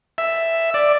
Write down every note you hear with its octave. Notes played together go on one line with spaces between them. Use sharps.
E5
D5